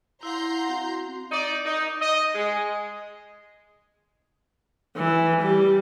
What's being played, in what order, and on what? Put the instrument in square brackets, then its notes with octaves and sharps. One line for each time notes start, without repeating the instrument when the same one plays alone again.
[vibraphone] E4 F5 F#5 [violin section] A#5 C6 G6
[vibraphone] C4 F#4
[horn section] D#4 D5
D#4
D#5
G#3
[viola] E3
G3